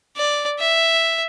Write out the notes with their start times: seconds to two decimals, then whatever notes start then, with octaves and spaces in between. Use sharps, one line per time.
0.17 D5
0.59 E5